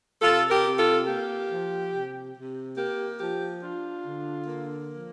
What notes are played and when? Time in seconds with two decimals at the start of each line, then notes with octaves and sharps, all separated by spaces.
0.22 C3 F4 A4
0.50 G4 A#4
0.65 C3
0.79 F4 A4
1.07 A#3 G4
1.49 F3
1.92 C3
2.35 C3
2.77 A#3 G4
3.20 F3 G4
3.63 D4 F4
4.04 D3
4.47 A#3
4.90 F3